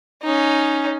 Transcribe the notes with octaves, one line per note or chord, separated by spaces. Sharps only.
C#4 D#4